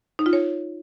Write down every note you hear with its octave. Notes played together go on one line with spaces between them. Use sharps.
D#4
F4
C#5